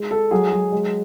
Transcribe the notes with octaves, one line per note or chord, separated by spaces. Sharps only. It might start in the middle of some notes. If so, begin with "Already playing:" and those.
Already playing: G#3
G#3 A4
F#3 G#4
F#3
G#3